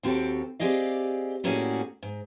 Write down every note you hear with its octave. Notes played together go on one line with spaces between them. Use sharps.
D#2 C4 F#4 G4 A4 G5
C4 G4 G#4 D5 D#5 F5
A2 G3 A#3 C#4 F#4 G#4
G#2